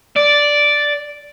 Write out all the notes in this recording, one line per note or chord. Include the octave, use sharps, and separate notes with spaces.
D5